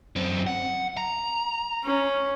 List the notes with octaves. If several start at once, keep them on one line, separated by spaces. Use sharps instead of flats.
F#2 C4
F#5
A#5
C#4